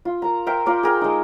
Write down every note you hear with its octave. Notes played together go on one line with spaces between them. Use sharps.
F4
A#4 A#5
A#4 C5 E5 G5
F4 A#4 D5
G#4 A#4 G5
G#3 D#4